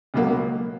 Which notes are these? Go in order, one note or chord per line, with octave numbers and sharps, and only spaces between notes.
C#2 B2 F#3 A#3